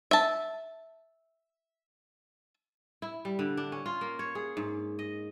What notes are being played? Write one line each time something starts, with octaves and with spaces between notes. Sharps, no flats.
E5 A5
E4
G3
D3
D4
C#4
F4
A#3
C#5
G#4
G#2
D#5